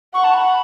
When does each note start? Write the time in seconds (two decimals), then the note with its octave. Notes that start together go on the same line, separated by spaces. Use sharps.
0.14 F#5 C#6
0.24 A5
0.34 B5